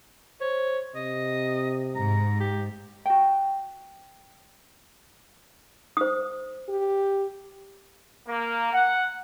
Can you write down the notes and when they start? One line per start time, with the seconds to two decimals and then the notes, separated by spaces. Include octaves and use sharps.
0.41 C5 C#5
0.95 C3 D#5
1.96 G#2 A#5
2.40 G4
3.06 F#4 G5
5.97 C5 D#6
6.69 G4
8.28 A#3
8.73 F#5